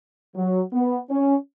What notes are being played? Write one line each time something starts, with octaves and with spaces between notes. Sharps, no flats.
F#3
B3
C#4